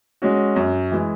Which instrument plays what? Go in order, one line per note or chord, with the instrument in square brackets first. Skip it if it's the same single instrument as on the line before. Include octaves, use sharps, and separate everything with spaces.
[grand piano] G#3 C#4 F#4
F#2
E3 G#3